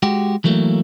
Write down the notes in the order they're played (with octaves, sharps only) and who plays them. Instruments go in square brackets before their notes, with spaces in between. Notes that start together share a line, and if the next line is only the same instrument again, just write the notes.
[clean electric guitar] G#3 F#4 G4
E3 F#3 A3 A#3